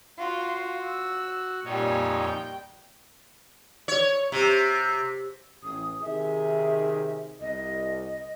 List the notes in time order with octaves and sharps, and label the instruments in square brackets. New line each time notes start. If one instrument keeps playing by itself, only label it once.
[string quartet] F4 [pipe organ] F#4
[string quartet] E6
[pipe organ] F2 D#4 C#5 [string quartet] A#2 G3 G#5
[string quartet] G5
[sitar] C#5
C3
[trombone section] A1 [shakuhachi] D#6
[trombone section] C3 D#3 G#4 [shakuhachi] E5
[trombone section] C2 [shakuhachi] D#5